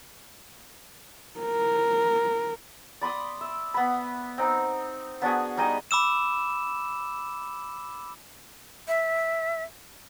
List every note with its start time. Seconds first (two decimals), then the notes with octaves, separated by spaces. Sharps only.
1.40 A#4
3.01 D5 B5 C6 D#6
3.41 E5
3.74 B3 B5
4.38 C4 D#4
5.22 B3 D4 F#4 G#4
5.57 G3 D#4 G#4 D#5
5.91 B5 D6 E6 E7
8.88 E5